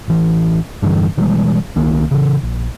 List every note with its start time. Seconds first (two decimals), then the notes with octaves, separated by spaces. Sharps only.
0.08 A1 E3
0.82 G2 D3 E3 G3
1.17 B2 E3 G3 G#3
1.75 C2 D#3 A#3
2.11 C#3 E3
2.43 A#1